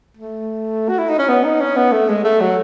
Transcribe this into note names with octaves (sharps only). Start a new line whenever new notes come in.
A3
F#4
E4
D#4
C#4
B3
D#4
C#4
B3
A3
G#3
A3
F#3